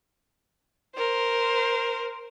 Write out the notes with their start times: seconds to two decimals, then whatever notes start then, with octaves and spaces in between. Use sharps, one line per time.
0.95 A#4 C5